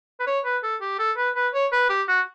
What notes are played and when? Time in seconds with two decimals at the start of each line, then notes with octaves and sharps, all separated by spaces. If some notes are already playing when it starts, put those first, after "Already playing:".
0.20 B4
0.27 C#5
0.45 B4
0.63 A4
0.81 G4
0.99 A4
1.17 B4
1.35 B4
1.54 C#5
1.72 B4
1.90 G4
2.08 F#4